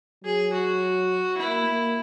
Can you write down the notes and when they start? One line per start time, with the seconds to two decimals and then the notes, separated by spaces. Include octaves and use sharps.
0.24 F#3 G#4
0.53 F#4
1.37 A#3 E4
1.66 A#3